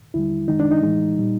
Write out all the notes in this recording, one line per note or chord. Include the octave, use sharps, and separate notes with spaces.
D#2 D3 G3 E4
F#2 D#3 G#3 D#4
D4
D#4
A2 E3 G#3
A#2 G3